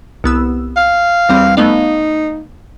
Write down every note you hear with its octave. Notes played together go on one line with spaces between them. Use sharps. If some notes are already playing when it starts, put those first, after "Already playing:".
C2 B3 E6
F5
E2 G3 C4
A3 B3 D#4 F5